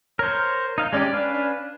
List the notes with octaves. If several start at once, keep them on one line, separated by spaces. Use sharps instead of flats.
A#4 C5 C#5
D#4 F5
G#3 C#4 G4 D5
C#4 D4 B4 F5
D4